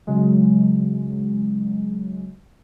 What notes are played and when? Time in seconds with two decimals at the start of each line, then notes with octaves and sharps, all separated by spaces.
0.07 C#3 F#3 G#3